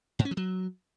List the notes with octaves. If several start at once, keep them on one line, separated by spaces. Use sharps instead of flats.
G#2
C#4
F3
F#3